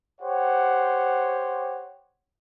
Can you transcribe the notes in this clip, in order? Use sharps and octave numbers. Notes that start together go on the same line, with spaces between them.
G4 C5 C#5 F#5